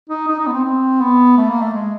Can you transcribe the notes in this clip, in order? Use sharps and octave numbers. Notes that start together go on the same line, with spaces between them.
D#4
D#4
D#4
B3
C4
C4
B3
A3
A#3
A3
G#3